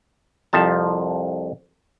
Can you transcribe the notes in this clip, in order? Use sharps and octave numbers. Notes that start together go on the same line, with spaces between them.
C2 F2 F3 A5